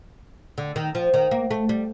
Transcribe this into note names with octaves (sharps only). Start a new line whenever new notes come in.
D3
D#3
F3
D#3
A#3
A3
G3